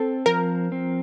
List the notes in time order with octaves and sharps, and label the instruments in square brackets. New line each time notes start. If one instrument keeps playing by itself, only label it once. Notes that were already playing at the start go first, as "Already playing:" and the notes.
Already playing: [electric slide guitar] C4 [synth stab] A4
[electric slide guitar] F3 [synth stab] A#4
[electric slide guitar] C4